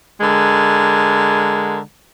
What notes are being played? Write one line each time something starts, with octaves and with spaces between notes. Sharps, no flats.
D3 G#3 A#4